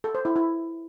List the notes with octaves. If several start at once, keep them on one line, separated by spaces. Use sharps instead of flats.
A4
C5
E4
E4